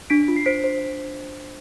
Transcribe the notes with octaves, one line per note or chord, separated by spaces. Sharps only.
D4 B6 D7
F4
C7
C5 B6 D7
C5